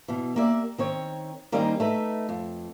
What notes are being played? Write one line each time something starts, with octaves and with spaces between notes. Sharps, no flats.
B2 E3
A#3 G4 D5 E5
D#3 C4 C#5
D#3 G3 A#3 C4 C#4 D#4
A3 D#4 B4 E5
F2